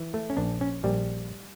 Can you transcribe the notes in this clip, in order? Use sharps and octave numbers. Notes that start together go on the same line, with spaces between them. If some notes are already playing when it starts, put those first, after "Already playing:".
Already playing: E3
A3
C#4
A#1 D4
C#4
A#1 G3